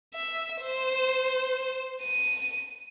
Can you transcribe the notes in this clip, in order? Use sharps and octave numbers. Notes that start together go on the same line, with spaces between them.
E5
C5
D#7